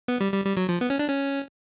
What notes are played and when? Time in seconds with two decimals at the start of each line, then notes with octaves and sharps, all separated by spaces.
0.08 B3
0.21 G3
0.33 G3
0.45 G3
0.57 F#3
0.69 F3
0.81 B3
0.90 C#4
0.99 D4
1.08 C#4